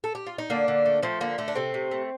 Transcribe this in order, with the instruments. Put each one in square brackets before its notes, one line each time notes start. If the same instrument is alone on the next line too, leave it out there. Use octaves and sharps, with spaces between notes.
[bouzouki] A4
G4
F4
D#4
D3 A#3 D4
D3
A3
F3 A3 C4
D3 A#3
D3 A3
D4
C3 A3 C4
C3
A3